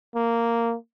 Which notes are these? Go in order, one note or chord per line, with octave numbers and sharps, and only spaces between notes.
A#3